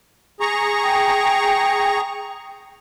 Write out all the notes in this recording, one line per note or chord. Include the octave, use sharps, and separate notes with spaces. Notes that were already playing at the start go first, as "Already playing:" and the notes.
G#4 A#5 C#6
G5